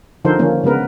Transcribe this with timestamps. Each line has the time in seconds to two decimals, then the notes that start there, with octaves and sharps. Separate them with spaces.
0.25 D3 F3 D#4 A4 A#4 C5
0.39 D3 D#3 F3 A#3 C#4
0.63 C#3 G#3 B3 A#4 B4